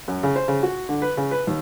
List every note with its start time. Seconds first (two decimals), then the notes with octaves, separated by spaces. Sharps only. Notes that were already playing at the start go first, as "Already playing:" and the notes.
0.08 F#2
0.23 C#3
0.36 C5
0.48 C#3
0.63 F#4
0.89 D3
1.02 B4
1.17 C#3
1.31 B4
1.47 D#2